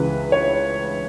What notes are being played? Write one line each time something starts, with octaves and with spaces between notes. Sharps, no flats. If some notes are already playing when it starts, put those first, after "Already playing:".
Already playing: C#2 C#3 E3 B4
C#5